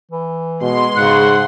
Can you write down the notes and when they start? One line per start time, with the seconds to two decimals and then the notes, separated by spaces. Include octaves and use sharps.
0.12 E3
0.62 B2 G#3 C6
0.97 G#2 C#3 F#5